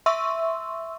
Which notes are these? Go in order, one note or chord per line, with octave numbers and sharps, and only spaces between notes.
E5 C6 C#6 E6